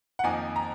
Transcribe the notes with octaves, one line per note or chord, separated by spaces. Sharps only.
F#5
F2 D#3 A#3 D#4 G#5
A#5